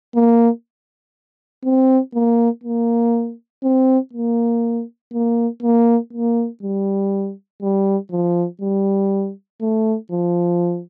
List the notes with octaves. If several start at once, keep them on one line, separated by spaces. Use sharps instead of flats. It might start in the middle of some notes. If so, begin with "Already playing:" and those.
A#3
C4
A#3
A#3
C4
A#3
A#3
A#3
A#3
G3
G3
F3
G3
A3
F3